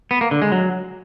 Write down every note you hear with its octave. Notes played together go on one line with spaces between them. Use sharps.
B3
A#3
D3
G#3
F#3